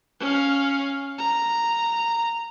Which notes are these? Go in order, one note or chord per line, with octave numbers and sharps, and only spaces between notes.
C#4 F5
A#5